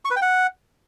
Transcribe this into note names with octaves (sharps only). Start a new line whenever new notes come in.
C#6
B4
G5
F#5